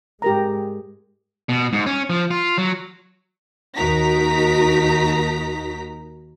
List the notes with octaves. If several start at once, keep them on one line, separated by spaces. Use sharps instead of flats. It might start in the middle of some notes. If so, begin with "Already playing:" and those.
G#2 G#3 G4 A#4 A#5
B2
G#2
C#4
F3
F4
F#3
D#2 D#4 F#4 A#4 A#5 B6